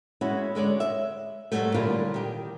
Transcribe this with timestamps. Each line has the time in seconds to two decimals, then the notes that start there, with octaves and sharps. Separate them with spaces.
0.21 G#3 C#4 E4 F#4
0.55 D3 G#3 C#5 D5
0.80 E5
1.52 G#2 C#3 F#3 G3 A3
1.74 A#2 D3 G3 E4 F4 A#4
2.14 D#3 G4